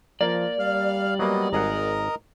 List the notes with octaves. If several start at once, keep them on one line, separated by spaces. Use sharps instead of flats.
F3 A#3 A#4 D5
G3 F5 F6
F#3 A#3 B3 D#5
G#1 G#4 A#4 D#5 F#5 A#5